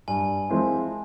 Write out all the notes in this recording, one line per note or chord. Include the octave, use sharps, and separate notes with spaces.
G2 G#5
F3 G#3 C4 E4